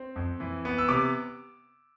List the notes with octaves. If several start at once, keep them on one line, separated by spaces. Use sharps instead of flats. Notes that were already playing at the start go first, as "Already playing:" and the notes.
Already playing: C4
F2
E3
B3
E6
C3 D6